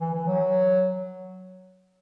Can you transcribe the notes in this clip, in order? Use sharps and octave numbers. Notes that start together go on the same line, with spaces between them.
E3
E3
F#3